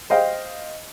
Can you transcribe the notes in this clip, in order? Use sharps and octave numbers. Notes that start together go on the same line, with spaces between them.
C5 D#5 F5 G5